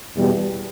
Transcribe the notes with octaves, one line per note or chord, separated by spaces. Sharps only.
E2 B2 G3